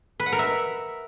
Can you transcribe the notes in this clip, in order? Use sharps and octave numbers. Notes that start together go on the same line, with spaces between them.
B4
F#5
A#4
E5